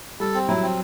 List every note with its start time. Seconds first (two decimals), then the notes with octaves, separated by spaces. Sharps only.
0.20 G3 A4
0.34 C4
0.48 F#3 E4
0.62 C4